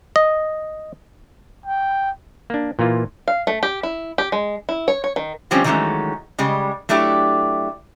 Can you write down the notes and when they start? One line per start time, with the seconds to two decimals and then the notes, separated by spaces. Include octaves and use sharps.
0.16 D#5
1.66 G5
2.50 A#3 D4
2.79 A#2 E3 A#3 F4
3.28 F5
3.47 A3
3.63 G4
3.83 E4
4.18 G4
4.32 G#3
4.69 E4
4.88 C#5
5.04 C#5
5.16 D#3
5.51 D3 F3 G3 C4 C#4
5.64 D#3 E3 F#3 G#3 A3 C#4
6.39 C#3 G3 G#3
6.89 F#3 A3 D4 E4 G4